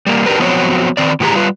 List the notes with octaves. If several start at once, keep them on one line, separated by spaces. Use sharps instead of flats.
G3 A#3
D4 G4 A#4 B4
F3 F#3 B3 C4 F#4 C#5
D#3 C4 D5
A2 D#3 E3 G4 G#4 A#5
G3 F4 B4